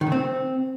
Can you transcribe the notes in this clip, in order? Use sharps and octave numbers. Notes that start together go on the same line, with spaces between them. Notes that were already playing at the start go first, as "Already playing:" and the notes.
D#3
C#3
C4